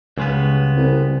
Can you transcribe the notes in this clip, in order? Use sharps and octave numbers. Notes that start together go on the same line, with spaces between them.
C#2 C#3 G3 G#3 B3
C2